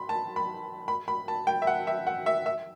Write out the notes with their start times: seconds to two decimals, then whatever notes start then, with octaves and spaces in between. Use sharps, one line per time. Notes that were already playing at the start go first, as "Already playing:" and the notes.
Already playing: B5 C6
0.09 A5
0.36 B5
0.88 B5
1.08 B5
1.28 A5
1.47 G5
1.62 E5
1.67 F#5
1.87 E5
2.07 F#5
2.26 E5
2.46 E5